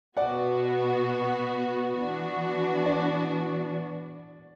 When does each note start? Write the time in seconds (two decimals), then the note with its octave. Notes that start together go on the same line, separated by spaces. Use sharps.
0.17 B2 B3 F#4 D5 F#5
1.96 E3 B3 D4 F#4
2.86 D5